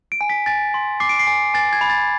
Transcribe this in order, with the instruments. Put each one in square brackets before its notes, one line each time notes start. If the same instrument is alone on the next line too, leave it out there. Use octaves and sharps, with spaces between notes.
[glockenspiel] D7
G#5
B6
G#5 A6
C6
D6 C7
D7
C7
G#5
G#5 A6
G#6
B5
A6